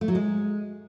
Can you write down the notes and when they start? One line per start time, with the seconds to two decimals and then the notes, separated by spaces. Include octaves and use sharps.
0.01 A3
0.08 F#3
0.15 G#3